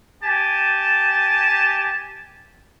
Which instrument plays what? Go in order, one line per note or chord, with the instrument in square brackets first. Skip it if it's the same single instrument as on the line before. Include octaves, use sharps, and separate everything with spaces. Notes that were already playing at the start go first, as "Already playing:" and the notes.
[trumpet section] G4 G#5 A5